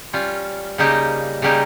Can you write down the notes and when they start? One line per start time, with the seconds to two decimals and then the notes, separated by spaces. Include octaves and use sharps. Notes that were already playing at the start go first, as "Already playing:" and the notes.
0.13 G3 C#4 F4
0.78 C#3 G3 A#3 D#4 G4
1.42 C#3 G3 A#3 D#4 G4